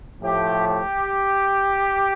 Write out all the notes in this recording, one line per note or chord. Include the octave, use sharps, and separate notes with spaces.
A2 F3 A3 G4
G4